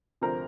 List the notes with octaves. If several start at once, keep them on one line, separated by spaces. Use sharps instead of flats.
D2 C3 F3 A#4 C5